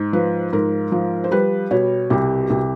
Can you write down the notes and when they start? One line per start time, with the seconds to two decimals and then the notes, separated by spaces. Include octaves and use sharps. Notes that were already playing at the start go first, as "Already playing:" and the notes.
Already playing: G#2
0.13 F3 B4
0.53 G#2 A#4
0.92 F3
1.24 C5
1.31 G3 B4
1.71 B2 C#5
2.10 C2 G4
2.50 C2